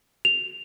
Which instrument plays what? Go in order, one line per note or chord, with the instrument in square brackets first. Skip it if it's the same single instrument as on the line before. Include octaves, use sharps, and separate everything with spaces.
[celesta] F7